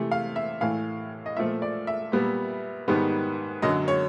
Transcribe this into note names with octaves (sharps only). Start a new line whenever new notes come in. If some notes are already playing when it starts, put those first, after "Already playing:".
Already playing: C3 E3 A3
F5
E5
A2 E3 A3 F5
D#5
A#2 F3 A3 E5
D5
E5
A#2 G3 B3
G#2 D#3 G3 B3
F#2 D3 F#3 D#5
C#5